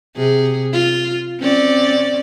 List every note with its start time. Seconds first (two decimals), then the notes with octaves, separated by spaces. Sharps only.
0.16 C3 G#4
0.73 F4
1.40 C4 C#4 D5